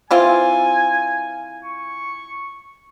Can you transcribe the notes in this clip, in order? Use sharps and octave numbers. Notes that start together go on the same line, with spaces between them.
E3 C4 F4 G#5
C#6